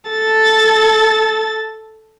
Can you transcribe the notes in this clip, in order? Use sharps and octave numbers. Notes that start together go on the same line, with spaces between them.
A4 A6